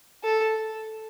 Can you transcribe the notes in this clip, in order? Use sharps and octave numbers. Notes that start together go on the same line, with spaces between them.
A4